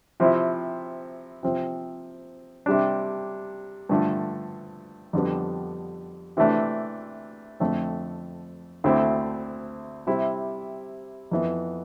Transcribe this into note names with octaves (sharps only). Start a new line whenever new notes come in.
C3 F3 C4 E4
C3 F3 C4
C3 G3 D4
G2 D3 F3 A3
F2 D3 G3 B3
C3 E3 A3 D4
F2 D3 A3 C4
D2 D3 A3 C4 E4
C3 G3 C4 E4
F2 E3 B3